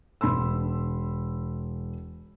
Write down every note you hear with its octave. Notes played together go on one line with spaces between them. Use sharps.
E1 B5 C6 E6